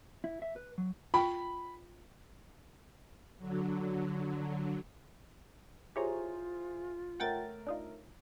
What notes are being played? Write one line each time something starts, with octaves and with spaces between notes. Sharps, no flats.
E4
E5
B4
F#3
F4 G5 B5
D3 F#3
E4 F4 G4 G#4 C5 C#5 A#5
A3 A#4 C#5 F#5 G5 A6
D4 D#4 F4